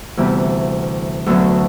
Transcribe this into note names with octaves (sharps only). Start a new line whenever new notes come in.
D2 C3 E3 G3 B3
D2 D3 F#3 B3